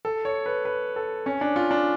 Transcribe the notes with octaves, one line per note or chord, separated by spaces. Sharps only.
A4
C#5
B4
B4
A4
C#4
D4
F4
D4